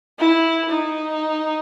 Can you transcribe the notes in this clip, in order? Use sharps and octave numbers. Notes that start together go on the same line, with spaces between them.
E4
D#4